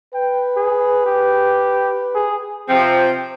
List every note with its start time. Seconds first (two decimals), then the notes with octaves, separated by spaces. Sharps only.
0.14 B4 G5
0.57 G#4
1.06 G4
2.15 G#4
2.69 C3 F3 C4 G5